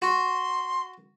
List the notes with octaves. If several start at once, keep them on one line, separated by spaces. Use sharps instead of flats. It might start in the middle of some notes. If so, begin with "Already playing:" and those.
F#4 C6